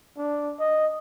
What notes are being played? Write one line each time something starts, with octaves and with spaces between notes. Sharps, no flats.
D4
D#5